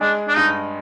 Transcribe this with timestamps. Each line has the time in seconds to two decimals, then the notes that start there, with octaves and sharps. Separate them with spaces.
0.01 G#3 D4
0.28 D4
0.36 G2 D#4